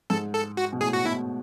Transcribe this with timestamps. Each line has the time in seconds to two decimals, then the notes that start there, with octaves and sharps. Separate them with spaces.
0.10 G#2 A4
0.35 A4
0.57 F#4
0.73 B2
0.81 A2 G#4
0.93 F#4
1.05 B2 E4